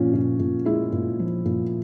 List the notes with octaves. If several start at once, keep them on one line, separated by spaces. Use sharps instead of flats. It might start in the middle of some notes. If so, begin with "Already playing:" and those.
Already playing: A#2 F3 C#4
A#2
A#2
G#3 E4
A#2
F3
A#2